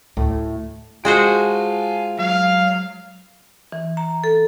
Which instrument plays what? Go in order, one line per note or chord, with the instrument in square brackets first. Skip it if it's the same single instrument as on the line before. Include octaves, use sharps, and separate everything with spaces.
[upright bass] D2 [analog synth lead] A2
[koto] G#3 F#4 C5 [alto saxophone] F4 [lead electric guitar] G5 G#5
[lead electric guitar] F#3 [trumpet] F5
[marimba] E3
A#5
A4